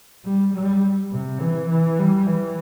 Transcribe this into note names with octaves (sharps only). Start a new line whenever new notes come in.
G3
G3
C3
E3
E3
G3
E3